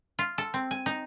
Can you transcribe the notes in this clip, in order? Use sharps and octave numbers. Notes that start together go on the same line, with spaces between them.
F4
A4
C4
G#5
D#4